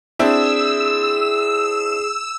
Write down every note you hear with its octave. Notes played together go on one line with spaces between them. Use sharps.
C4 D4 E4 G#4 E6